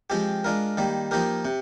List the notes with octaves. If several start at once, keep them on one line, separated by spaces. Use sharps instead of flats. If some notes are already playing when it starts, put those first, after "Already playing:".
F3 G#3 C4 G4
G#3 D4 F4 A#4
D#3 G3 A#3
F3 A#3 D#4 G4 A#4
C3